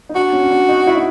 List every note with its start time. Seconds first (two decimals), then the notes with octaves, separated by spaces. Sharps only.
0.09 D#4
0.15 D4 F#4
0.33 C#4
0.43 C#4
0.50 D4
0.69 D#4
0.87 E4
0.95 D#4